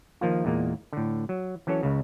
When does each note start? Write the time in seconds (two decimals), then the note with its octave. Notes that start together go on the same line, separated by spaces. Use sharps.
0.21 D#3 F3 A#3 F4
0.45 E2 A#2 G#3 A#3
0.93 A2 D3
1.29 F#3
1.67 E3 F#3 C#4 A4 C#5
1.83 C#2 C#3